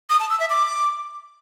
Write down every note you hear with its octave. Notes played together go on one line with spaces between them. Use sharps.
D#6
A5
E6
E5
D6